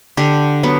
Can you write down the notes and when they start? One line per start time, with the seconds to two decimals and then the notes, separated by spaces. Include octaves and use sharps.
0.17 D3 G4
0.63 F#3 B3